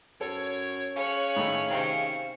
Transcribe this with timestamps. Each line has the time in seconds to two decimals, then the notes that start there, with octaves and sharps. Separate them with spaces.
0.21 F#2 A4 C#5
0.96 C#4 G#4 C#5 F5 F#6
1.36 A2 D#3 A3
1.71 C3 D#3 C4 C#6